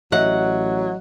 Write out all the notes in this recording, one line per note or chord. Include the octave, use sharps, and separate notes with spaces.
A1 F#3 D#5 E5 F#5